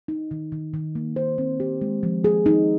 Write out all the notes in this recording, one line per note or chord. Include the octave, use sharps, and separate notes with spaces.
D#4
D#3
D#3
D#3
A#3
C5
C4
G4
G#3
F3
G#4
D#4